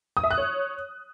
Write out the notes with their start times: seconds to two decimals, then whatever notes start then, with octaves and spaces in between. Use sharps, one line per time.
0.17 D#6
0.24 E5
0.31 F#6
0.38 C#5